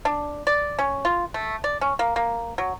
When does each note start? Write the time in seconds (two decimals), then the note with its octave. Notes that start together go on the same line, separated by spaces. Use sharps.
0.05 D4
0.47 D5
0.79 C#4
1.05 F4
1.34 A3
1.64 D5
1.81 C#4
1.99 A#3
2.16 A#3
2.58 F#3